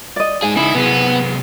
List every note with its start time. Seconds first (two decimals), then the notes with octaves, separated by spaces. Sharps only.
0.16 D5 D#5
0.42 G#2 G#4 G#5
0.57 C#3 D#4 E4
0.75 C3 F#3 B3 G#4